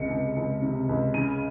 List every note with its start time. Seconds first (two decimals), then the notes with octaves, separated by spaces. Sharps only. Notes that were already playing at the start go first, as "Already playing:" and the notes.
Already playing: C#2 C3 C#7
0.10 C#2
0.36 C#2
0.62 C3
0.89 C#2
1.14 C#3 D#7